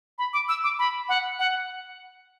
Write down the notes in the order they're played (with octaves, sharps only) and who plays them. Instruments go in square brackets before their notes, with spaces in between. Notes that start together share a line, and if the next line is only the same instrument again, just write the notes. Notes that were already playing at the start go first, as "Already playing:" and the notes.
[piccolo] B5
D6
E6
D6
B5
F#5
F#5